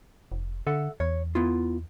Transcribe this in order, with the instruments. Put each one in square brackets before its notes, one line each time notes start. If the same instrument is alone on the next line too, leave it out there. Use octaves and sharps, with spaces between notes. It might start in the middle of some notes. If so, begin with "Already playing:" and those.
[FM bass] F1
[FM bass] D3 [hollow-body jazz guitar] A4 E5 F#5
[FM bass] E2 [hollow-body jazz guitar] C#5
[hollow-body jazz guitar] B3 E4 F4